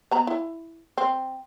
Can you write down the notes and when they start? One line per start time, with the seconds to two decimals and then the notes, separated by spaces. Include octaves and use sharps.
0.11 B3 A#5 B5
0.27 E4
0.98 C4